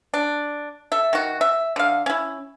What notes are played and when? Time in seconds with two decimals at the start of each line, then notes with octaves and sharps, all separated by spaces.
0.14 D4
0.92 A4 E5
1.13 D#3 F#4
1.41 E5
1.76 D3 F5
2.06 C#4 E4